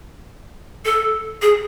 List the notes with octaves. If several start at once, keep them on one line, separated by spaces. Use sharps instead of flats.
A4
G#4